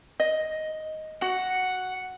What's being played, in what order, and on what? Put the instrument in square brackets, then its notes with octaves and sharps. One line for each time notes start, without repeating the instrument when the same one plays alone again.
[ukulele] D#5
[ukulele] F#4 [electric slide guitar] F#5